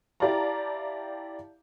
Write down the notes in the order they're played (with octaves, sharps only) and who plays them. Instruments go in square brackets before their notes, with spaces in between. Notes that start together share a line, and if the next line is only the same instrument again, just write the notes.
[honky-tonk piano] E4 G4 D5 F5 A5 A#5